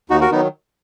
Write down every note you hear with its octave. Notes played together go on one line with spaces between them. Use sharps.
D#2 D#4 F#4
F#4 A#4
D#3 F#3 B3 D#4